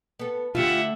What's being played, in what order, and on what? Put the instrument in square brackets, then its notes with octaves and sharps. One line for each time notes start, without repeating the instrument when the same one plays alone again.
[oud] B3 A4
[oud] D3 A3 [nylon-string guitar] F4 G4 [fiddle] E5 F#5